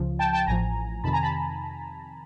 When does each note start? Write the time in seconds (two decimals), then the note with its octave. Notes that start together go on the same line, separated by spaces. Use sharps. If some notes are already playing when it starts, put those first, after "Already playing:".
Already playing: C#2 C#3 F3
0.19 G5 A5
0.33 G5 A5
0.47 A1 A2 F3 G#5 A#5
1.04 F2 C3 D#3 A5 B5
1.13 G#5 A#5
1.22 A5 B5